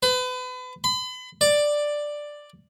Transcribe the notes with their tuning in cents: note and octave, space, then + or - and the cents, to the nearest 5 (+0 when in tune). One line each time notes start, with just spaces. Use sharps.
B4 +35
B5 +40
D5 +5